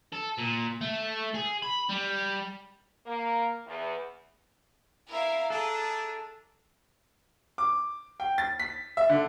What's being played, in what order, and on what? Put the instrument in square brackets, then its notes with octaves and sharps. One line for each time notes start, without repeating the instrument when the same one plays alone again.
[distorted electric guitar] A4
A#2
A3
G#4
B5
G3
[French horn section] A#3
E2
[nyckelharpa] E4 E5 [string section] A#4 F5
[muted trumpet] D4 [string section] G#4 [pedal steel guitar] A4 [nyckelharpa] A#5
[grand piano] D6
G5
A6
B6
E5
D3